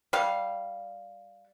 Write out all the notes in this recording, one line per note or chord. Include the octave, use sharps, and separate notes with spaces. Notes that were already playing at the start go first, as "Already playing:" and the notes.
G3 F5